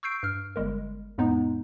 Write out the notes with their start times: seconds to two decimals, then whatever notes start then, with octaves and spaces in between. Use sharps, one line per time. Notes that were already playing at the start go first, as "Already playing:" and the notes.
0.03 C#6 E6 G6 C7 D7
0.23 G2 F6
0.56 G1 G3 G#3 A#4
1.18 F2 A2 G#3 B3 D#4